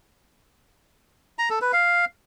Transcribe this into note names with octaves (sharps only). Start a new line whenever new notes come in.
A#5
A4
B4
F5